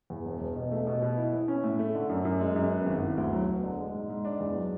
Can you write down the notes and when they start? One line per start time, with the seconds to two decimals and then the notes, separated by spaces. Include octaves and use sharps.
0.10 E2
0.25 E1
0.41 E1
0.56 B2
0.72 A3
0.87 B2
1.02 B2
1.18 E4
1.33 E3
1.48 C#4
1.64 A2
1.79 A3
1.95 D3
2.09 F#2
2.25 F#2
2.41 G#3
2.56 F#2
2.71 B3
2.86 G#1
3.02 E3
3.17 D2
3.33 F#3
3.48 E1
3.63 D3
3.79 G#3
3.94 G#2
4.09 G#2
4.25 D4
4.40 E2
4.56 F#3